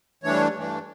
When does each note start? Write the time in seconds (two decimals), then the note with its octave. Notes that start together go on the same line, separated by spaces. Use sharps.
0.23 G2 E3 A3 D4 C#5
0.54 G2 E3 A3 D4